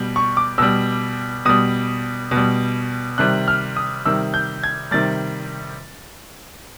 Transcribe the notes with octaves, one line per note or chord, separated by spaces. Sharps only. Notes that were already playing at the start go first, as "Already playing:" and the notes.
Already playing: B2 G3
C#6
D6
B2 G3 E6
B2 G3 D#6
B2
G3
C3 D#3 G3 F#6
F6
D#6
C3 D#3 G3 E6
G6
G#6
C3 D#3 G3 A6